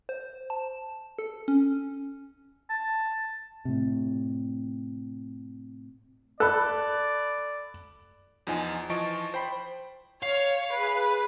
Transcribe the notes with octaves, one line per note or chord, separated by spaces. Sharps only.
C5
A5
A4
C#4
A5
A2 C3
A4 D5 B5 F#6
E2 F3 D#4 G#5
E3 F3 D#5 A5 C#6 D7
C5 G5 B5
C#5 F5
G#4 B4